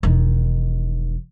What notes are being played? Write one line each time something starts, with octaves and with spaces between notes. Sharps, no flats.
E1 D#3